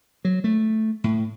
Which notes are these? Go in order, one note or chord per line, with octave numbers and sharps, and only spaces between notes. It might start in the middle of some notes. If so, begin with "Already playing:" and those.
F#3
A3
A2